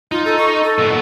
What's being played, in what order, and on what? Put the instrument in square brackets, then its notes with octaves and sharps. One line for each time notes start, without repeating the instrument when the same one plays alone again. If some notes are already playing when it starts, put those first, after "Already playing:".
[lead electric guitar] D#4 [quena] F4
[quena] A4
C#6
A4
[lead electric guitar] A#2 B3